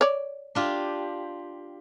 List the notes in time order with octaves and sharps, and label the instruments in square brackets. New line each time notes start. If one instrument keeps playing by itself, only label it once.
[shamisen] C#5 D5
[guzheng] D4 F4 G4